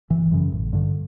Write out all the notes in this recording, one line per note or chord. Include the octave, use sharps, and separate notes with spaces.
G1 E3
F#2 C#3
A1
G2 D3